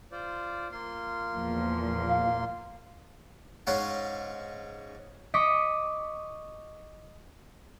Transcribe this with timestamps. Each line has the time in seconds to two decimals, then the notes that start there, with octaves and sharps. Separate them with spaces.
0.12 F4 C5 D5
0.72 A#3 F4 C6
1.33 E2 A#2 F3
2.08 F5
3.67 G#2 C#4 F5 F#5
5.34 D#5 C#6 D6 B6